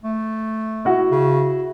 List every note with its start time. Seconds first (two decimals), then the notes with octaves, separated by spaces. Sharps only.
0.03 A3
0.85 E4 F#4
1.11 C#3